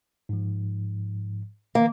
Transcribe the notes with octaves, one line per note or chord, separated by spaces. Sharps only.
G#2 F3
D#3 F3 A#3